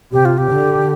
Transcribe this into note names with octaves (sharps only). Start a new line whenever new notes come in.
C3 G4
F4
G4
D3